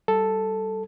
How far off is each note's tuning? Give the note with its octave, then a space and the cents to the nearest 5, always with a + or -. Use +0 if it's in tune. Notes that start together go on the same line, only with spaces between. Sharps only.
G3 -20 A4 +0